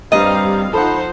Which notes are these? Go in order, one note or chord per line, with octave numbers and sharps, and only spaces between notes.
G2 G3 C4 D#5 F5 A#5
F3 D#4 A4 C5 F#5 B5